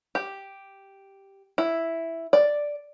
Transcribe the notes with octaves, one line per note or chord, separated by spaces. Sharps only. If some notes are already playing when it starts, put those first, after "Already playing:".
G4
E4
D5